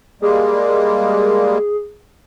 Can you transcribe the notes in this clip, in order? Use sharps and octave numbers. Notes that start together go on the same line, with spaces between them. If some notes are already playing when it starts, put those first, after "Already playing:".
G3 G#3 A#3 G#4